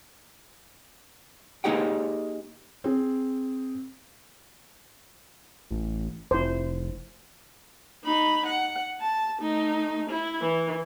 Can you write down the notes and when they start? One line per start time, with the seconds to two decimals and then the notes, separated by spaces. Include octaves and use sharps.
1.64 A#3 D#4 G4 G#4 F#5 G5
2.84 C4 G#4
5.71 A1
6.31 F1 E4 C5
8.05 D#4 B5
8.46 F#5
9.00 A5
9.41 A3 D#4
10.10 E4
10.42 E3